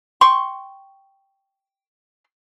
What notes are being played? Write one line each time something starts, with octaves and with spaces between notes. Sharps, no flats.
G5 C6 C#6